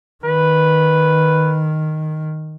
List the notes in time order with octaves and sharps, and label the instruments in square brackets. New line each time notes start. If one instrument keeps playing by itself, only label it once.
[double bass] D#3 [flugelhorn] B4